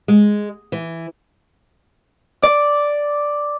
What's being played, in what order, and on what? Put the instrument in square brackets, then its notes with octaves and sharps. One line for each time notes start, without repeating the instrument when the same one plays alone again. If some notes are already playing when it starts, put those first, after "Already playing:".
[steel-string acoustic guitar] G#3
E3
[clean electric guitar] D5